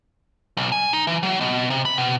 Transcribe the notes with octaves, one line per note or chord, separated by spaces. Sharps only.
B1
G#5
D#4
E3
F#3
B2
C3
B5
B2